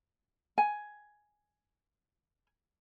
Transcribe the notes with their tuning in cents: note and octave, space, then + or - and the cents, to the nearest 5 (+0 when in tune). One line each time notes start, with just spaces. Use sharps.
G#5 +5